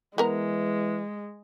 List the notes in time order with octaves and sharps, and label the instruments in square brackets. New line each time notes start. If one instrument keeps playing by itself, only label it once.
[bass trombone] E3 [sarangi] G#3 [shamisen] B3 A#4 A#5